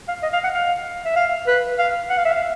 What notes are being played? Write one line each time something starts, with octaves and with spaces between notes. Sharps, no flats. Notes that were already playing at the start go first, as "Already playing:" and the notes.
F5
D#5
F5
F#5
F5
E5
F5
B4
F5
F#5
F5
E5
F5